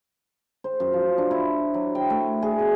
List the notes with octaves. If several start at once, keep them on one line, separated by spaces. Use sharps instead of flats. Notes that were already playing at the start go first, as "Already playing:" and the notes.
C5
F#2
F3
D4
E4
F#3
G5
A3
G#4
B2